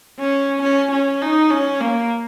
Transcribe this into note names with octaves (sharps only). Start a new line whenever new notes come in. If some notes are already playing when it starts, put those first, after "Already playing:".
C#4
C#4
C#4
D#4
C#4
A#3